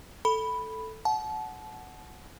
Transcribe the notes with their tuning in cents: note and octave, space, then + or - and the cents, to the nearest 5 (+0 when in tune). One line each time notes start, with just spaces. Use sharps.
A4 +0 B5 +0
F#5 +0 A5 -30